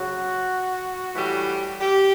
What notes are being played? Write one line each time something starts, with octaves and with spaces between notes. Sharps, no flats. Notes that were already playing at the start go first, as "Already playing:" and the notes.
Already playing: C#3 F#3 F#4
A2 E3 G3
G4